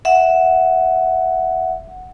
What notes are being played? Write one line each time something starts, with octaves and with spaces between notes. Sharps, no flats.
E5 F#5